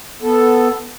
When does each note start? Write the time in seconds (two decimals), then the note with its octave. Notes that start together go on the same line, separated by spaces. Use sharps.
0.22 B3 A4